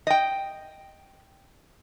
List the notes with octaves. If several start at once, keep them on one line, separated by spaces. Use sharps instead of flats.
D#5 G5